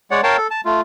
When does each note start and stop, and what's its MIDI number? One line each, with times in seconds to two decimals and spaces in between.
0.11 0.21 56
0.11 0.21 73
0.11 0.21 74
0.11 0.21 78
0.23 0.37 70
0.23 0.37 73
0.23 0.37 77
0.23 0.37 79
0.23 0.37 81
0.37 0.47 69
0.51 0.61 81
0.65 0.81 57
0.65 0.81 65